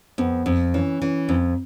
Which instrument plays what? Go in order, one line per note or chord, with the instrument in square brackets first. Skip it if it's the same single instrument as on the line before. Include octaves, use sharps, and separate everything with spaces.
[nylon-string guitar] F2 [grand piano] B3
[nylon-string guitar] F2 [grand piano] C4
[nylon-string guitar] E3 [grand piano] C#4
[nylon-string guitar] E3 [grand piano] C#4
[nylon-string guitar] F2 [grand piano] C4